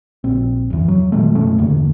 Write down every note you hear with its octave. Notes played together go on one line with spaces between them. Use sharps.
A#1 C4
F#1 E2
F#3
A#2 D#3 G#3 A3
F#1 B2 A3 C#4
E2 G2 D3 A#3